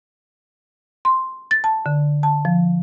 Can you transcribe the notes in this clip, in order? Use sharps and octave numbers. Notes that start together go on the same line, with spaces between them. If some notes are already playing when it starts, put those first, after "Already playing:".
C6
A6
A5
D3
A5
F3